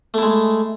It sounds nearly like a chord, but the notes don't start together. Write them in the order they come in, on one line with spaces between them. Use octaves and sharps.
A3 E4 G#3